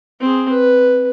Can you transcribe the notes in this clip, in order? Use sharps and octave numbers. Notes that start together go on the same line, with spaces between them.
C4 G#4
B4